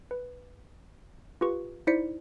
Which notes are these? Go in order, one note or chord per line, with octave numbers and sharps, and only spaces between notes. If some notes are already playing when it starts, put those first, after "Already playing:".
B4
F4 G4 B4 C#6
D#4 E4 C5 D5 B6 C#7